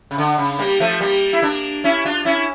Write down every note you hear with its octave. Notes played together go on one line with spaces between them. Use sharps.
C#3
D3
C#3
G3 A#3
F3 A3
G3 A#3
E4
A#3 D4
C#4 E4
D4 F4
C#4 E4